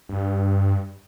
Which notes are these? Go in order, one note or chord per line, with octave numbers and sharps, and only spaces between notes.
G2